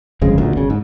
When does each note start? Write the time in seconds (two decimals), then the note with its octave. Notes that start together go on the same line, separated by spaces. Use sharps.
0.21 G1 F2 C#3 G#3
0.38 A1 D2 A#2
0.57 G1 C#3
0.70 G#2